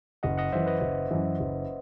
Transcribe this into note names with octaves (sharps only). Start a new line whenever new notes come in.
F#1 D#5 F#5
D#5 F#5
F#2 E3 C5 E5
B4 D#5
F#1
F#2 E3
F#1